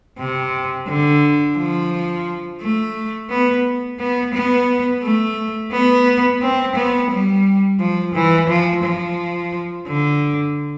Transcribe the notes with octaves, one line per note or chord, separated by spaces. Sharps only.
C3
D3
F3
A3
B3
B3
B3
A3
B3
C4
B3
G3
F3
E3
F3
F3
D3